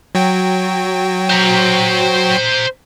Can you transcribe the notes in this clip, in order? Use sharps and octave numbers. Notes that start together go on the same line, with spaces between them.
F#3 F#4 G5
C5 A#5